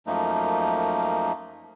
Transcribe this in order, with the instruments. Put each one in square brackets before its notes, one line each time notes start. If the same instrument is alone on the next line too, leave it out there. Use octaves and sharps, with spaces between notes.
[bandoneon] F#2 F3 A3 A#3 D#4